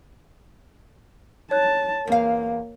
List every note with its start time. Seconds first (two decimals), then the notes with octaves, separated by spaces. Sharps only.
1.51 C#5 A5 F#6
2.07 E2 A#3 F5